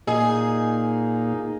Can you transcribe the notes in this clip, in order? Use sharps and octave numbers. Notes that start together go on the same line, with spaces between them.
A#2 D#4 G#4